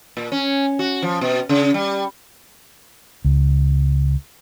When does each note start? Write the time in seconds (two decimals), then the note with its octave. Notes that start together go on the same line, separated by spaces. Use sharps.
0.17 A#2
0.32 C#4
0.79 F#4
1.02 F3
1.21 B2
1.49 C#3
1.74 G3
3.25 C#2